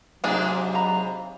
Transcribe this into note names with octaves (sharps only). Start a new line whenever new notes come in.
G#2 C3 F#3 A#3 D4 G#4
F5 A#5 B5